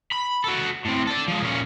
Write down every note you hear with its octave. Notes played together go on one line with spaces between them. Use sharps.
B5
F#4 A4
A2 C4
A4 D5
F3 G#3
A#2 C#4